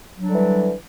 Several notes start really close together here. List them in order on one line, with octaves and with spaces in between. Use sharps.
F#3 D4 G3 D3 E3